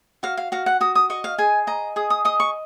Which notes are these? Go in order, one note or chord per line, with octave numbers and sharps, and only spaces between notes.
F#4 F5
F5
F#4 F5
F#5
F#4 D#6
D#6
D#5 C#6
F5
G#4 G#5
D#5 A#5
G#4 D#6
D#6
D#5 D#6
C#6